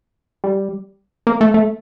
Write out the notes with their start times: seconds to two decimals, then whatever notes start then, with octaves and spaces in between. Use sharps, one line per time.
0.44 G3
1.27 A#3
1.41 A3
1.54 A3